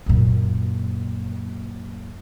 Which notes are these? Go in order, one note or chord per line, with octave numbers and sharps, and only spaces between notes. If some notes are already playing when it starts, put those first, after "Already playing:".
F#2 A#2